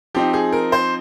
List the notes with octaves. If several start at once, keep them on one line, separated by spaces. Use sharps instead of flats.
F3 C4 D#4 G4
G#4
A#4
C5